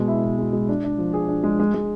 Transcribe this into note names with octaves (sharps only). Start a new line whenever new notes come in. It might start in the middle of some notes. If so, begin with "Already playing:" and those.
Already playing: B2 G#3
E4
B2
G#3
G#3
D4
D4
F3
G#4
D4
G#3
G#3
G#3